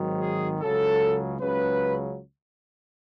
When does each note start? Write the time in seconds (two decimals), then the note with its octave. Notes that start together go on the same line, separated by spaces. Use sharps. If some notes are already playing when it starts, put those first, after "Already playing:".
Already playing: G#1 G#2 D#3 F#3
0.21 G#4
0.61 C#2 C#3 F#3 A4
1.40 C#2 C#3 F#3 B4